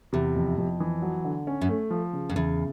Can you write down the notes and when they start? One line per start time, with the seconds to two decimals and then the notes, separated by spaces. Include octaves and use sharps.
0.13 E2 C3
0.36 F2
0.58 F2
0.80 E3
1.02 F#3
1.24 D3
1.47 C#4
1.61 F#2
1.69 A3
1.90 F3
2.13 C#3
2.29 F2
2.36 E2 C#3